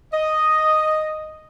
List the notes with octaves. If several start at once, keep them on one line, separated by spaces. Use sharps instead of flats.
D#5